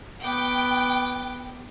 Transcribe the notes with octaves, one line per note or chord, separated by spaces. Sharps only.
B3 G5 D6